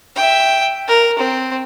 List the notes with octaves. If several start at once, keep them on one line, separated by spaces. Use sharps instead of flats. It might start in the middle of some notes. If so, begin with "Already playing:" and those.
E5 G5
A#4
C4